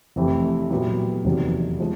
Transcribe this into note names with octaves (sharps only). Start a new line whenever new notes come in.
F1 F2 C3 E3 A3
A#2 F#3 B3 E4 G4
F1 E2 C3 D#3 F#3
F3 G#3